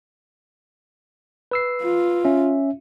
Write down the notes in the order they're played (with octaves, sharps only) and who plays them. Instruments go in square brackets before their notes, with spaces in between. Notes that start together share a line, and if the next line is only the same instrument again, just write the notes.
[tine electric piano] B4 E6 C7
[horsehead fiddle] F4
[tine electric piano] C#4 E5